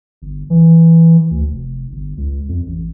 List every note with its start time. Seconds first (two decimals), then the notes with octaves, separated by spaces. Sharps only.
0.22 G1
0.50 E3
1.31 D2
1.51 F1
1.92 G1
2.17 C#2
2.49 F2
2.66 A1